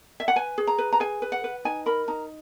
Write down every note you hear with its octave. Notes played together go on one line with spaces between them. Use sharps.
E5
F#5
B4 G#5
G#4
A#5
B4
A#5
G#4 G#5
B4
F#5
B4
D#4 G#5
A#4 B5
D#4 A#5